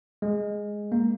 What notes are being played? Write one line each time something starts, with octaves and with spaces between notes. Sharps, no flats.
G#3
A#3